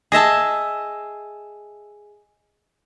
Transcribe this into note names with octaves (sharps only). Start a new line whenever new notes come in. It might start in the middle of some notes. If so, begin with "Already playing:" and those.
G#4 D#5 E5 A5